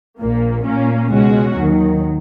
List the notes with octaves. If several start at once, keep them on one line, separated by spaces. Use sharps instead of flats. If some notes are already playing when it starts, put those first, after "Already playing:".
A#1 A#2 A#3
A#2 A#3 C#4
C#2 B2 G#3 C#4 F#4
D#2 D#3 F#3